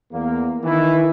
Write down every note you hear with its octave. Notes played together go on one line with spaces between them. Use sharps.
E2 A#3
D#3 E3 E4